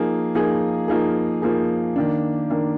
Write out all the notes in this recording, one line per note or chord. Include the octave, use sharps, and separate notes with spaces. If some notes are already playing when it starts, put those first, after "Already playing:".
Already playing: F3 A#3 D#4 G#4
F3 A#3 D#4 G#4
F3 A#3 D#4 G#4
F3 A#3 D#4 G#4
D#3 A#3 D4
D#3 A#3 D4